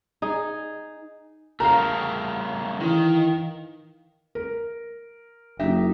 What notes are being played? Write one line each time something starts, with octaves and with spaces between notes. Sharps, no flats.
D#4 G#4
C#3 A3 A#4 F5 A#5
D#3 E3
A#4
F#1 D#4 G4 E5